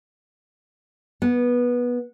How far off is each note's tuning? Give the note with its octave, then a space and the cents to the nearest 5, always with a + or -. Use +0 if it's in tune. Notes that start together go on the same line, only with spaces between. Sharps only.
B3 -15